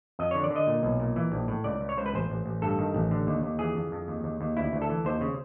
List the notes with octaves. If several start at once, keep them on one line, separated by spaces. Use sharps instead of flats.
F2 D#5
D3 C#5
D5
D3
D#5
A#2
B1
A#2
E3
A#1
A2
C#2 D5
C#2
C#5
C#2 C5
B4
A1 C5
A1
A1
G2 A4
D#3
A1
D3
D#2
D#2
E3 G#4
F2
F2
D#2
D#2
D#2
D2 E4
D2
A4
E3
D#2 C5
C#3